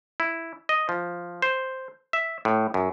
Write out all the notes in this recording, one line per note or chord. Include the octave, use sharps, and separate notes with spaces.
E4
D#5
F3
C5
E5
A2
F#2